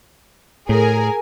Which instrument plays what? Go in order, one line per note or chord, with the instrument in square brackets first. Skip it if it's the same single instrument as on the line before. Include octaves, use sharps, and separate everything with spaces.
[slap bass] A2 [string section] G#4 A#4 G#5